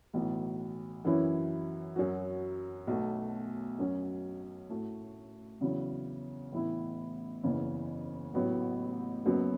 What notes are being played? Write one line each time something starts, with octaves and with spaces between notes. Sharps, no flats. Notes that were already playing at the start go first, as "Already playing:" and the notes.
B1 A2 E3
F#2 E3 C#4 E4
F#2 F#3 C#4 F#4
B1 B2 A3
F#2 F#3 C#4
A2 A3 F#4
E2 C#3 F#3 C#4 E4
A1 A2 E3 B3 E4
F#1 E2 C#3 E3
A1 A2 F#3 B3
F#1 F#2 F#3 B3